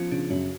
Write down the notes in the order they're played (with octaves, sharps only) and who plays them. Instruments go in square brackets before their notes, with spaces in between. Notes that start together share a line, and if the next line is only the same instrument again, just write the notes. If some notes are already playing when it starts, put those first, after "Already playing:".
Already playing: [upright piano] F3 [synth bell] B3 C#4
[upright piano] C#3 [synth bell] D4
[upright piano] F#2 [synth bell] F#4